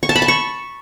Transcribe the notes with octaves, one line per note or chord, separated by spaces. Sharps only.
C#6
A5
B5
A5
C#6